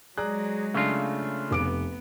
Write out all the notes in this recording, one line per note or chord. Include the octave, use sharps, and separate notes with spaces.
F#3 G#3 G#4 D5 A#5 F#6
C#3 A3 D4 F4
F1 B3 D6 D7